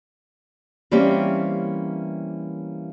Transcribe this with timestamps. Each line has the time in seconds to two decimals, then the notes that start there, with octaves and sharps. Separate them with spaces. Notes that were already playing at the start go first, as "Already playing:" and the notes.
0.91 E3 G3 A#3 C4 C#4 G4